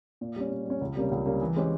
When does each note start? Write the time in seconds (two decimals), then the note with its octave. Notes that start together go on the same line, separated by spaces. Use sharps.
0.21 A#2
0.36 G3 C#4
0.51 A#2
0.66 G3 C#4
0.81 C#2
0.95 C3 G3 A#3 C#4
1.11 C#2
1.25 C3 G3 A#3 C#4
1.42 E3
1.56 G#3 C#4 G4 C5